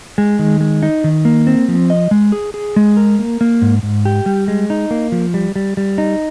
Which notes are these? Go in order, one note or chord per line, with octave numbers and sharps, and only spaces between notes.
G#3
D#3
G#3
D#4
D#3
A#3
C4
F3
D#5
G#3
G#4
G#4
G#3
A#4
A#3
A#3
G#2
G#2
G4
G3
G#3
D#4
A#3
F3
G3
G3
G3
D#4